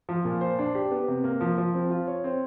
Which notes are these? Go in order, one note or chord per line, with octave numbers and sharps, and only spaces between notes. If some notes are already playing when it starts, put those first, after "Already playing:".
F3
A#2
C5
D4
G4
B3
C3
A#3
F3
F3
C4
F4
C#5
C4